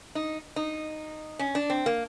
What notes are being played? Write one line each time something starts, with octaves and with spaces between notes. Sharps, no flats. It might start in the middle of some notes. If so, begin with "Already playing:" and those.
D#4
D#4
C#4
D4
C4
A#3